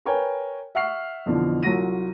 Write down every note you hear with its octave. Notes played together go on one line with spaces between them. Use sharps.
A#4 B4 C#5 G5 G#5
E5 F#5 C#6 F6 C7
F2 B2 D3 E3 F3
C2 F#3 F4 F#4 A#6 D#7